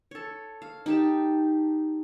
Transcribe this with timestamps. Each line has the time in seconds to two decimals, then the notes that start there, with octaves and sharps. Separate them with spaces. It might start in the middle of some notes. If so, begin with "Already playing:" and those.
0.11 A4 C#5
0.62 F5
0.86 D#4 G4 A5